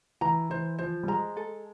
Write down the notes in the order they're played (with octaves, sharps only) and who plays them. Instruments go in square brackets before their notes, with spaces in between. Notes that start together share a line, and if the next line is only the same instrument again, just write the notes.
[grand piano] E3 [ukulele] A#5
[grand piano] E3 [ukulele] C5
[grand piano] F3 [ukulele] C5
[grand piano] G3
[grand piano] G#3 [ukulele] A#5
[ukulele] A4